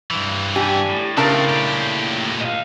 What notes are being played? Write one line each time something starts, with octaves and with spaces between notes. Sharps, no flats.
G2 E3
D4 G4 G#5
A2
C#3 A3 C4 D4 A#4 A5
A#2 G4
D#5 F5